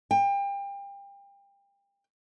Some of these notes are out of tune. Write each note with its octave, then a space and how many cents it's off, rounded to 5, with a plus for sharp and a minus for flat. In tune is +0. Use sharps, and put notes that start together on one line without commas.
G5 +30